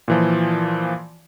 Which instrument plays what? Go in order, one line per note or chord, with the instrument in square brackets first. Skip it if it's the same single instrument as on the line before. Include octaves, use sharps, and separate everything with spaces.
[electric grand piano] A#2 E3 F3